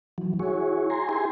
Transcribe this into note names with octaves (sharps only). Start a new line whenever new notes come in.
E3 F#3
E4 F#4 G#4 C#5
G#5 A#5 C6
E4 G4 G#4 G#5 C6